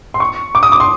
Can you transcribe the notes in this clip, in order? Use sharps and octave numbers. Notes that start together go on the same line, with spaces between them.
C6
C#6
D6
D#6
D6
C6